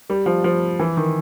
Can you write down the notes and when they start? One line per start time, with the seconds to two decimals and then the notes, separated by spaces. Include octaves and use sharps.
0.10 G3
0.26 F3
0.44 F3
0.79 E3
0.97 D#3